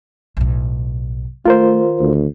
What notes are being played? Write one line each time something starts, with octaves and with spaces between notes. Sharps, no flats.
B1 A2
D#3 A3 F4 A#4 C5
D2